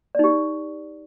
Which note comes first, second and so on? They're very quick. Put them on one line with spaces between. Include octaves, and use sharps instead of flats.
D5 D#4 G4